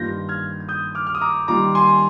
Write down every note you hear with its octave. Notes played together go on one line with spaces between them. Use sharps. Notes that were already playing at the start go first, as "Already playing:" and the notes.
Already playing: G2 D#3 A#3 F4 G6 A#6
F6 G#6
G#6
D#6 G6
D6 F6
F6
D#6
A#5 D6
D#3 G3 A#3 F4 A#5 D6
G#5 C6